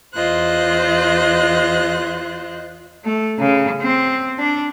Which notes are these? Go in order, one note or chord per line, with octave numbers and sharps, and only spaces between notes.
E2 F4 C5 D#5 F#6
A3
C#3
C4
D4